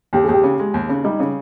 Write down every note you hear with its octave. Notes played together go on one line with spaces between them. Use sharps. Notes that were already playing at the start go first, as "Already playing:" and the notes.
D#2 G4
D#2 G#4
G4
C#3
G#3
D#2
C#3
G3 D#4
C#3